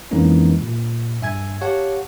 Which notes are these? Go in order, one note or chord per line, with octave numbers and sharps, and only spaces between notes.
F2 E3 G#3 A#3 C#4 D#4
A#2
G2 E5 G#5 G#6
G4 C#5 F5 F#5 A5